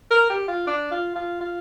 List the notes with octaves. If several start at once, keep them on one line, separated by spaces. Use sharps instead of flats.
A#4
G4
F4
D4
F4
F4
F4